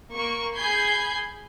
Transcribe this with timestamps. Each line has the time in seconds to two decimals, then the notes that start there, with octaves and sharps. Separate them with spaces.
0.13 A#3 C#6
0.56 G#4 B5 G6 G#6 C7